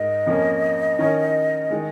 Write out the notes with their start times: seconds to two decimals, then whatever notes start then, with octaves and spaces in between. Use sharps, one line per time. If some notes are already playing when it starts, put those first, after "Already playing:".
Already playing: G#2 D#4 A#4 D#5
0.26 F2 F3 A#3 C#4
0.99 D#3 C#4 A#4 C#5
1.70 D#3 G#3